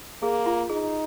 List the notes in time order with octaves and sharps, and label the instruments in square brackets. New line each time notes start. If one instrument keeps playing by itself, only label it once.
[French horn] A#3 [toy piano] G#4
[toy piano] F4
[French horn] D#4 [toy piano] G#4